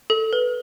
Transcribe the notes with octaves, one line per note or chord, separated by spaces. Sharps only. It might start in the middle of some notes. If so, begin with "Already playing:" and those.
A4
B4